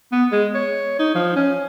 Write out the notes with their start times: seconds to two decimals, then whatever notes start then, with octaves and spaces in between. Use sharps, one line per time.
0.12 B3
0.32 G#3
0.55 C#5
0.99 D#4
1.15 F3
1.36 C#4